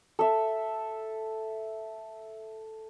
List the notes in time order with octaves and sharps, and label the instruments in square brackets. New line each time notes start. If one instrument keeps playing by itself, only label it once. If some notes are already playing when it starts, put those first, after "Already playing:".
[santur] A4 E5